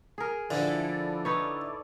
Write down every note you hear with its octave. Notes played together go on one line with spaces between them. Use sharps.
G#4 A#4
D3 F3 E4 A4 D5
D#4 B4 C#5